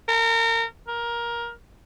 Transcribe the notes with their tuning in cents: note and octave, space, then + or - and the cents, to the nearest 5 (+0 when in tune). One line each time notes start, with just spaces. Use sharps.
A#4 -30
A#4 +15